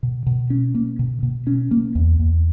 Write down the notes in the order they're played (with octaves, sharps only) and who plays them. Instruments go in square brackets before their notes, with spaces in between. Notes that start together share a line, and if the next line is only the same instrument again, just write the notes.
[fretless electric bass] B2
B2
C#4
A#3
B2
B2
C#4
A#3
E2
E2